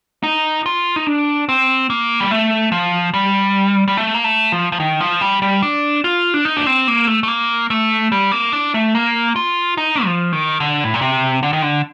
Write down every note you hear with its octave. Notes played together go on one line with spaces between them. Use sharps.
D#4
F4
D#4
D4
C4
A#3
G3
A3
F3
G3
G3
A3
A#3
A3
F3
F3
D#3
F3
G3
G3
D4
F4
D4
D#4
D4
C4
A#3
A3
A3
A#3
A3
G3
A#3
D4
A3
A#3
F4
D#4
F3
D#3
D3
A2
A#2
C3
D3
D#3
D3